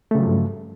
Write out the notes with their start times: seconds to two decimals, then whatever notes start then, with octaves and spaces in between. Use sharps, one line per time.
0.11 A3
0.15 C#3
0.18 F#3
0.22 F3
0.26 G2